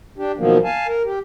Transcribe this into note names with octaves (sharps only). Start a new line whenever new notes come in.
D4 G4
B2 D#3 F3 F#3 A#3 B3
F5 G#5 A5
A#4
G4